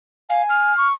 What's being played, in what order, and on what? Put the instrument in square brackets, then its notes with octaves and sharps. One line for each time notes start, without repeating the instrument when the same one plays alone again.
[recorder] F5 [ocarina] G#5
[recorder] F6
[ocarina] C#6